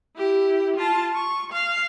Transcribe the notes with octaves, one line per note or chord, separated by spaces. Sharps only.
E4 G4
F4 A5
C#6
F5